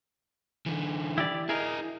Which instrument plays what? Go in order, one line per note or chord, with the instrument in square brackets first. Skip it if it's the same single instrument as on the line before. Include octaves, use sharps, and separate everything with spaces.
[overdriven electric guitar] D3 E3
[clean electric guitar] E4 G4 D5
[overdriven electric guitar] E4 D#5 [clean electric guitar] G#4 A#4